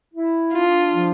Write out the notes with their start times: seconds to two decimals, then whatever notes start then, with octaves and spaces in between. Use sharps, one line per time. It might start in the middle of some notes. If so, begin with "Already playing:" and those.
0.14 E4
0.53 D4 F4
0.93 F3